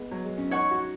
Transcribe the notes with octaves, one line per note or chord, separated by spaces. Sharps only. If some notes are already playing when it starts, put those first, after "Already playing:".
Already playing: G#3 B3
F#3
G#3
C#4
D#4 C#5 F#5 C#6
F#4